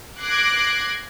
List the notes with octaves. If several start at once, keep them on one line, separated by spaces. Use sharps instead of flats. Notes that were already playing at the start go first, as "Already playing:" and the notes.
D6 F#6 G#6 A#6 C7 D7